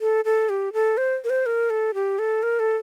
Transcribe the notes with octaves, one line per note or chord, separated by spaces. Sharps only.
A4
A4
G4
A4
C5
A#4
C5
A#4
A4
G4
A4
A#4
A4